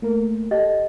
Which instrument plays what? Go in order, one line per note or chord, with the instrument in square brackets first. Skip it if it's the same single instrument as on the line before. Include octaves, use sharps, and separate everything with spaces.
[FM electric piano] A3 A#3 A#4
[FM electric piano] G4 A4 [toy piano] D#5